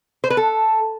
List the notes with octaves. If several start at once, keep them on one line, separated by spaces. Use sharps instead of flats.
C5
B4
A4